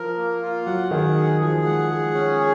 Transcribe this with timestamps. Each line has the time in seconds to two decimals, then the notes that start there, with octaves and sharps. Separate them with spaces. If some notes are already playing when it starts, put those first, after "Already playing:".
Already playing: F3 A#4
0.17 A#3
0.42 F4
0.66 F#3 F#5
0.91 D#3 G#4
1.16 G#4
1.41 F3 G#4
1.65 G#3 F#5
1.90 G#4
2.14 C#4
2.39 G#4